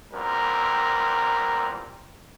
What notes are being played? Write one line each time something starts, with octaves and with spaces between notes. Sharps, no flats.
E2 A#2 G3 C4 A#4